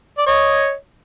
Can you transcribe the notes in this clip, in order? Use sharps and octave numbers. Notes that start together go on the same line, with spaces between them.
D5
C#5 D#5